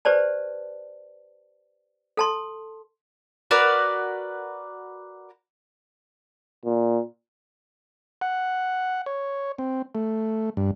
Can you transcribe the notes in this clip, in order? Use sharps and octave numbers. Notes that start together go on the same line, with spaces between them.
G4 B4 C5 D5 A5
A4 A5 C6
F#4 A#4 B4 D5
A#2
F#5
C#5
C4
A3
G2